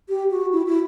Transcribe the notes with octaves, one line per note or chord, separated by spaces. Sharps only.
G4
F#4
E4
E4